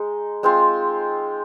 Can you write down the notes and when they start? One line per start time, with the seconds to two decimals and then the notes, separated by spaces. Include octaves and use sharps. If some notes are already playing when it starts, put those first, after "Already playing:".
Already playing: G#3 D#4
0.43 G#3 C4 F4